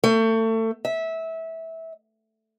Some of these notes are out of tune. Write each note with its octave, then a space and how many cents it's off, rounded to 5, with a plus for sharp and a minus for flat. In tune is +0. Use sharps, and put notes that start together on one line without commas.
A3 +30
E5 -20